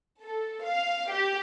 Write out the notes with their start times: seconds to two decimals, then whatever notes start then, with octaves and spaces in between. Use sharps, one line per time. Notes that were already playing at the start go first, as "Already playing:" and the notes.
0.23 A4
0.64 F5
1.11 G4